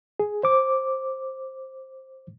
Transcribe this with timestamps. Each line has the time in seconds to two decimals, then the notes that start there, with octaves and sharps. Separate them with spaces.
0.20 G#4
0.43 C5 D6